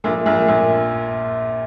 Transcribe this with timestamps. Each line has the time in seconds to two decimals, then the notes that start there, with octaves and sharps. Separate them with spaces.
0.04 A#1 A#2
0.26 A#1 A#2
0.48 A#1 A#2